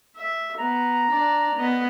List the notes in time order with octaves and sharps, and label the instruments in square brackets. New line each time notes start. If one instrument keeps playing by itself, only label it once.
[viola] E5
[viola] B3 [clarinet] A#5
[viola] D4 D5
B3 D#5